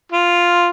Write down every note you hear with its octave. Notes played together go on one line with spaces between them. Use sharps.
F4